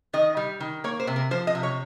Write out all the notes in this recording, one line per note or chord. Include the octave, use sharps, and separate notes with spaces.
D#3 D#5
G3
D#3
A#3 C#5
C5
C3
A#4
F3 C5
D#5
C3
C#5